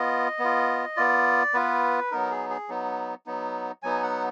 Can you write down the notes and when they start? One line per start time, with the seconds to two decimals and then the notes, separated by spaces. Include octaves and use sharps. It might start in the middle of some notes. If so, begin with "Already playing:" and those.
Already playing: B3 F4 D#5
0.39 B3
0.44 F4
0.97 B3 F4 D5
1.54 B3 F4 B4
2.11 F#3 B3 D#4 A#4
2.31 G#4
2.50 G#4
2.69 F#3 B3 D#4
3.26 F#3 B3 D#4
3.83 F#3 B3 D#4 G#5
4.03 F#5